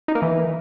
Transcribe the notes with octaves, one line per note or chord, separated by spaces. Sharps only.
D#4
A#3
E3